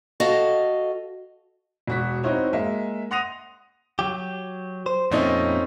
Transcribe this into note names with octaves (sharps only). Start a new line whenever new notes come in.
F#4 A4 D#5 F5
E1 F#4 B6
C4 D#4 E4 F#4 C5 C#5
G#3 A#3 E5
F#5 C6 D#6 A#6 D#7 F7
F#3 G4
C5
F2 A#2 A3 C4 C#4 D#4